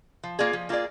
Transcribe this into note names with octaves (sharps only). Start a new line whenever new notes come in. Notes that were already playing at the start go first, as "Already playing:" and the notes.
F3
A#3 F4 G#4 D5
F3
A#3 F4 G#4 D5